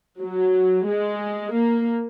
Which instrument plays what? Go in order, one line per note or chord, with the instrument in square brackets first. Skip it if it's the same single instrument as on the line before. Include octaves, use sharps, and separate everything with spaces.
[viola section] F#3
G#3
A#3